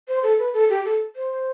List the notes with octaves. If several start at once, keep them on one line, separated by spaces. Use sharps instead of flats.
C5
A4
B4
A4
G4
A4
C5